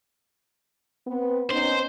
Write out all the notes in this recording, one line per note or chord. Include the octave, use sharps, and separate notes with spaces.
B3 C4
B3 C#4 D#4 C5